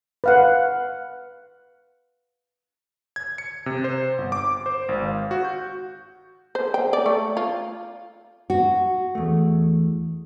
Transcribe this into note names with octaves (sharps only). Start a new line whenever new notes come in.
B4 F5 F#5
G#6
C#7
C3
C5
G1
D6
C5
G#1
F5
F#4
G6
C5
G5
D5
A3
F4
F#4
E2 A3